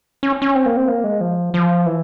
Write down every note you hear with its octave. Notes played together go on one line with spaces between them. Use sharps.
C#4
C#4
C4
A#3
C4
A#3
G#3
F3
F3
E3